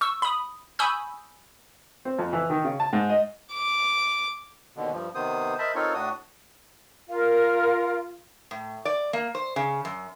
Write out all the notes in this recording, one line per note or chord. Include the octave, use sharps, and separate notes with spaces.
C#6 E6
B5 D#6
G#5 B5 C#6 D#6 E6 G6
C4
F2
E3
D#3
C#3
A5
G#2
D#5
D6
D#2 B2 D3
G2 F3
C3 D#3 B3 C5 D#6
A#4 C5 D#5 E5 A5 B5
C4 D#4 F4 A4 A#4 C#5
A2 D4 F#4 D#6
F4 A#4 F5
A2
D5
A#3
C5
C#3
F#2